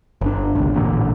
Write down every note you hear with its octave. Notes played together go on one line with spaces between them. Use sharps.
G1 D4
G#1 C#2
A1 A#2 D3